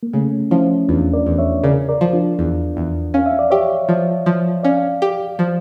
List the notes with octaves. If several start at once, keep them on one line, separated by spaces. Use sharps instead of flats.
A#3
C#3 A3 C#4
F3 C#4 E4
E2 D4 F4
A#4 D5
E2
C#5 E5
C#3 A#4 D5
A#4 D5
F3
D4 F4
E2
E2
C#4 F5
E5
D5
G4 C#5 E5
F3
F3
C#4 D5 F5
G4
F3